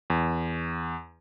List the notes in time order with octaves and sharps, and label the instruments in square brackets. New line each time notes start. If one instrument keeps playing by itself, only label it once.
[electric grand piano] E2